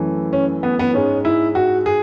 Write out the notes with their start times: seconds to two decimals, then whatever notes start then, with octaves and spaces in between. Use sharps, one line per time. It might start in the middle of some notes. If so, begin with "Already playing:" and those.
Already playing: F#2 E3 A3
0.33 C#4
0.63 B3
0.79 B3
0.94 G#2 G#3 C#4
1.25 E4
1.55 F#4
1.86 G#4